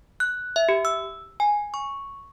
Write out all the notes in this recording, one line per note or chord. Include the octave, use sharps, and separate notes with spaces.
F#6
E5
G4
E6
G#5
C#6